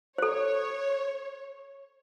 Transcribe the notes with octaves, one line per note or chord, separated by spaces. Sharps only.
A4 C5 C#5